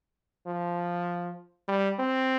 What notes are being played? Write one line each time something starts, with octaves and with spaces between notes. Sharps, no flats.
F3
G3
C4